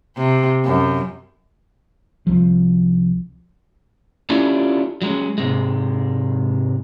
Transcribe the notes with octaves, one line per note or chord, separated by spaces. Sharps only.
C3
F#2
C2 F3
C#4 D4 E4 F4 G4 A4
F#3 G#3 C#4
G#2 C3 G#3